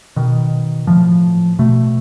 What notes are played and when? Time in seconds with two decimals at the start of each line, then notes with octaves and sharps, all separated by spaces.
0.16 B2 D#3
0.87 A2 F3
1.59 B2 A3